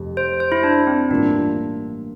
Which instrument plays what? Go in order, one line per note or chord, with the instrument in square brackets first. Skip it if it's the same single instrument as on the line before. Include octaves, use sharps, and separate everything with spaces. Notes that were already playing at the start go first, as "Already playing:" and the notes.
Already playing: [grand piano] F1 F2 G3
[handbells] C5
C5
E4
D4
C4
[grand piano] A1 G2 E3 A#3 F4 [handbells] D4